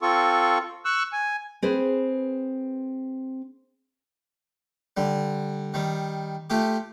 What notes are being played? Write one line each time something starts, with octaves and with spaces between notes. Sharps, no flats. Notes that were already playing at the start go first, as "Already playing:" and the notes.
C4 F4 A4 C#6
C#6 E6 F#6
G#5
C4 G#4 B4 C5
D3 G3
D#3 G3
A3 F4 G4